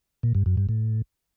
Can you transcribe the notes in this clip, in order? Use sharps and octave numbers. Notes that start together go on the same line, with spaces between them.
A#2
G2
F#2
G2
A2